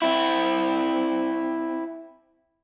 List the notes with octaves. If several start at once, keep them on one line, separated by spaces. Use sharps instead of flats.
C4 E4